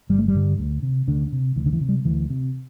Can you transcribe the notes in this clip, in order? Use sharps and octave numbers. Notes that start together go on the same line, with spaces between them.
G1 G3
A3
G3
G2 D3
D2
C3
D2 D3
C3
D2 E3
D3
E3
C3
G3
D2 E3
C3